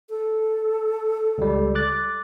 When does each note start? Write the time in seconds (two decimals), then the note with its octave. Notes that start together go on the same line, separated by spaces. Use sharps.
0.09 A4
1.38 C#2 G3
1.75 D6 F#6 A6